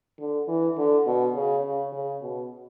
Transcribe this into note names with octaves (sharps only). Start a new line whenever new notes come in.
D3
E3
D3
B2
C#3
C#3
C#3
B2